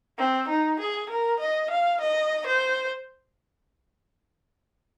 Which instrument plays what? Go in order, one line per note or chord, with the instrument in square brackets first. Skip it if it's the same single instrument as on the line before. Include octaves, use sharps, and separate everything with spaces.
[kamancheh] C4
D#4
G#4
A#4
D#5
F5
D#5
C5